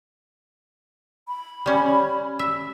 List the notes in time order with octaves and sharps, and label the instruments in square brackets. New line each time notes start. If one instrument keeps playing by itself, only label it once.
[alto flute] B5
[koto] G3 C#4
E5